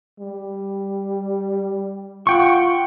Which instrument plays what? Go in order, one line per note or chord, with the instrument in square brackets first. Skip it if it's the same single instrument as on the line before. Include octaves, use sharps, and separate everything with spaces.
[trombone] G3
[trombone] F4 [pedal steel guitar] F#5 G5 C#6